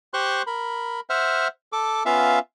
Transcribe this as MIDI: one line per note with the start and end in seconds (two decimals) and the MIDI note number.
0.14 0.42 67
0.14 0.42 72
0.14 0.42 84
0.14 0.42 85
0.14 0.42 90
0.47 1.00 70
0.47 1.00 83
1.10 1.48 72
1.10 1.48 76
1.10 1.48 78
1.10 1.48 89
1.73 2.03 69
1.73 2.03 86
2.06 2.39 59
2.06 2.39 61
2.06 2.39 65
2.06 2.39 76
2.06 2.39 77